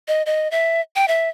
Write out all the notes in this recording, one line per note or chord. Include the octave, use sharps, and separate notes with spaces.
D#5
D#5
E5
G5
E5